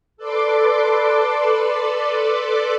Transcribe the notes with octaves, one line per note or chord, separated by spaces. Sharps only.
A4 B4 D5 C6 D6